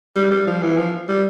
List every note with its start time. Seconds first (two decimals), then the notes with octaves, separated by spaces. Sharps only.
0.15 G3
0.31 G3
0.47 F3
0.62 E3
0.77 F3
1.08 G3